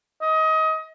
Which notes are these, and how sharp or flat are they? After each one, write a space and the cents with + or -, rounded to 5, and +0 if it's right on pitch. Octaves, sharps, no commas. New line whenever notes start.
D#5 +25